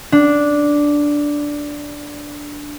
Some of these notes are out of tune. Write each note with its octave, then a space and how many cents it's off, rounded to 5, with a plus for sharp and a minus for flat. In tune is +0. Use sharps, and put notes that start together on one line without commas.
D4 -5